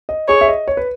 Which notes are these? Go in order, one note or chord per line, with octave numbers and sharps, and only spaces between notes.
D#5
G#4 C#5
E5
D#5
C#5
B4